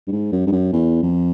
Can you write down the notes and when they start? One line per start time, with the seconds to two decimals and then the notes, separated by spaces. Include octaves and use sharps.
0.07 G2
0.12 G#2
0.32 F#2
0.47 G2
0.52 F#2
0.72 E2
1.03 F2